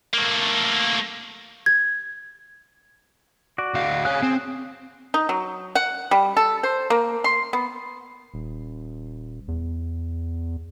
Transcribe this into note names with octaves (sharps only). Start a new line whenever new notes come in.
A3 A#3
G#6
F#4 D5
D2 F5
G#4 C#5 F5 F#6
C4
D#4
F#3
F#5
G3
A4
C5
A#3
C6
B3
D#1
E2